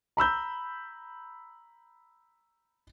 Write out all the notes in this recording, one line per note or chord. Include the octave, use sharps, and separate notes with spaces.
A#5 B5 E6 G6